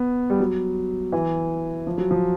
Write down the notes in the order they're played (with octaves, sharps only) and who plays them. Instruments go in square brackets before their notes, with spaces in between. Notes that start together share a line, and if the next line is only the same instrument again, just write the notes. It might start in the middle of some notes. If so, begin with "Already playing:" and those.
Already playing: [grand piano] B3
G3
F#3
E3
F3
F#3
F3